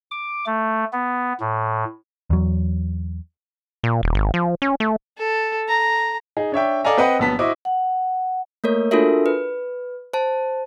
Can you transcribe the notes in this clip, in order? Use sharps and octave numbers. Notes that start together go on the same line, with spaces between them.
D6
A3
B3
A2
E2 F#3
A#2
D#1
G#1
F3
C#4
A3
A4
A#5
D#4 G#4
D4 C#5 E5 G5
A4 D5 D#5 F5 G#5 A#5
C4 B4 D#5 F#5 G5
A#1 F#3 B3 A5 B6
E4 F#4 C5 D#5 D6
F#5
A3 A#3 A#4 C#5
D4 F4 F#4 A4 A#4 E5
B4
C5 A5